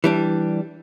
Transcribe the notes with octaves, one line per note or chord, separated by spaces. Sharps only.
E3 G3 D4